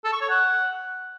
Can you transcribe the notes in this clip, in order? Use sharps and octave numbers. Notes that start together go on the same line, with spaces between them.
A4
C#6
C#5
F#5